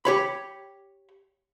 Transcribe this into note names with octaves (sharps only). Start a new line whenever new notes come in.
G4 C#5 B5